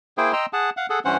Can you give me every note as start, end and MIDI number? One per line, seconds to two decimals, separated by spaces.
0.18 0.32 58
0.18 0.32 64
0.18 0.32 68
0.18 0.32 72
0.18 0.32 79
0.33 0.46 75
0.33 0.46 79
0.33 0.46 82
0.33 0.46 84
0.33 0.46 88
0.53 0.70 68
0.53 0.70 78
0.53 0.70 81
0.77 0.86 77
0.77 0.86 78
0.90 0.99 68
0.90 0.99 69
0.90 0.99 78
1.05 1.17 43
1.05 1.17 52
1.05 1.17 61
1.05 1.17 72
1.05 1.17 78